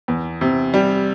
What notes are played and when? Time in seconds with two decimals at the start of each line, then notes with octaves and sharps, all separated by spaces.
0.08 E2
0.41 C3
0.74 G3